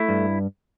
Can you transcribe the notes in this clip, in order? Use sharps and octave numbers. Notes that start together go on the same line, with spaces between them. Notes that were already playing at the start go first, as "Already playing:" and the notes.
Already playing: A3 E4
G2